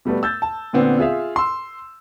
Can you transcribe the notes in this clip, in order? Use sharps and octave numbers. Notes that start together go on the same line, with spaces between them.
B2 G3 A3 B3
E6 G6 A6
A5
A#2 D3 B3 C4
F4 G#4 E5 F5
C6 E6